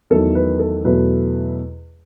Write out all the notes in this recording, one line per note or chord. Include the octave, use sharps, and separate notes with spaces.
E2 D#3 F#3 A3 A4
B4
A4
E2 B2 F#3 A3 B4